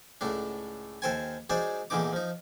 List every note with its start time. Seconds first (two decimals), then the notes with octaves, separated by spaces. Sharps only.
0.21 C#2 A2 A3 D4
1.02 D#2 A4 C5 G5 G#5
1.50 F#3 G#3 D#4 C5 D5
1.90 E2 A#2 D3 E3 D#4 D6
2.13 F3 D#4